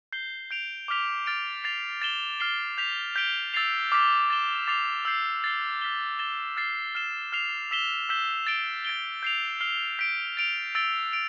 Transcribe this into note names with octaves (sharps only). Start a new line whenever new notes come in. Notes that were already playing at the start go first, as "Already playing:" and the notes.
G6 C7 G7
G6 D7 F7
D6 F6 B6 F7
F6 A6 D7
A6 C7 F7
A6 E7 G7
F6 C7 G7
G6 B6 F7
G6 B6 D7 G7
E6 A6 C7 F7
D6 F6 B6
A6 E7 G7
D6 A6 C7 F7
E6 G6 C7 F7
A6 C7 G7
F6 B6 E7 G7
A6 E7 G7
F6 A6 C7
F6 C7 E7 G7
F6 C7 F7
E6 B6 E7 G7
E6 G6 B6 E7 G7
A6 D7 G7
A6 D7 G7
G6 C7 F7
F6 C7 G7
G6 B6 D7
A6 D7 F7
E6 A6 D7 G7
D7 F7